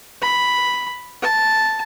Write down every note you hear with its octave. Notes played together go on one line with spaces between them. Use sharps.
B5
A5